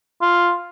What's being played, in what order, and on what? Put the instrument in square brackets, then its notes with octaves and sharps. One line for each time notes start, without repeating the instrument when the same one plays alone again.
[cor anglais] F4